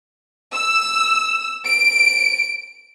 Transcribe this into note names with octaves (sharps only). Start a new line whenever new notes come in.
E6
D7